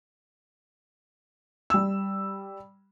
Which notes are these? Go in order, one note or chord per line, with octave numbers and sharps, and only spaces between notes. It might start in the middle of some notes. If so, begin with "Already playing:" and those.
G3 E6